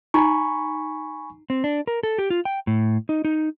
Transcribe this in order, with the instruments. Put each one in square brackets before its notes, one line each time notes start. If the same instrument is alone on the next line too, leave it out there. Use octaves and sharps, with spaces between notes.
[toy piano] D#4 A#5 [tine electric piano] G#5 B5 C#6
[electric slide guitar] C4
D4
A#4
A4
G4
F4
G5
A2
D#4
D#4